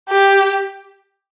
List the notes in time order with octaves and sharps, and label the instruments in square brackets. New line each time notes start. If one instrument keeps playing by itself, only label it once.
[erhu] G4